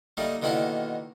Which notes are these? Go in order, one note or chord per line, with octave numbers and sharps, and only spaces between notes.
G3 A3 A#3 D#4
B2 D3 D#3 A#3 E4 G4